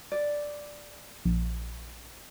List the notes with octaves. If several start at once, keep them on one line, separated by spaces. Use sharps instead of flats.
D5
A#1